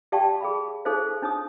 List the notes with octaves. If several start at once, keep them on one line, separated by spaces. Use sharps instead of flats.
G4 D5 F5 G5 A5 C#6
G#4 F5 B5
D#4 G#4 A4 C5 C#5 F5
D4 D#4 C#5 D#6